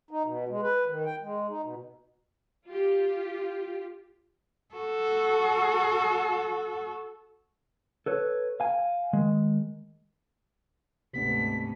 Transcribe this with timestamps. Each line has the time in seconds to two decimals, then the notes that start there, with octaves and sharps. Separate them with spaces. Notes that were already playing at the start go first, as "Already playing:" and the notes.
0.11 D#4
0.25 B2
0.49 G#3
0.62 B4
0.86 D#3
1.05 G5
1.22 G#3
1.49 D#4
1.64 B2
2.67 F4 G4
4.75 F#4 A4
8.06 A4 B4 C#5
8.60 F5 G#5
9.13 D#3 G#3
11.13 D2 G#2 C3 B3 D4 B6